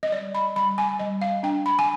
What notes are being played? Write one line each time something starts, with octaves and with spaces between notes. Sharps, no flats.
D#5
G3 D5
B5
G3 B5
G#5
G3 D#5
F5
D4 G5
B5
G#5